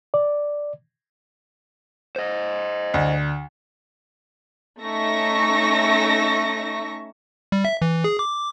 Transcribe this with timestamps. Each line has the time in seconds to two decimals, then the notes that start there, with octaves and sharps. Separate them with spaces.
0.14 D5
2.16 C5 D#5
2.94 D2
4.82 A3 C#4 D#4 E5 C#6 A#6
7.52 G3
7.65 E5
7.82 E3
8.04 G#4
8.19 D6